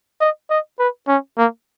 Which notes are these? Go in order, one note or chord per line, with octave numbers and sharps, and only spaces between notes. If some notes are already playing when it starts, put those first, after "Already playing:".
D#5
D#5
B4
C#4
A#3